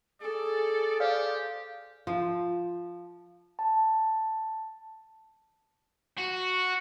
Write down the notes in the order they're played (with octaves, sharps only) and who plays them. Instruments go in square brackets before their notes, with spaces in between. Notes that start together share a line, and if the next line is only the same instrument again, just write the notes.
[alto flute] G#4 [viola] A4 [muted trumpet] D5
[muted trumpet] G4 [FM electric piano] C5 D5 F5
[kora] F3
[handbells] A5
[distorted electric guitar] F#4